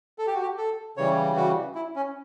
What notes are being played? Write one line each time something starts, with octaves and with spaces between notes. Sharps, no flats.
A4
G4
F#4
G4
A4
C#3 E3 G3 C#5
F#4
E4
C#4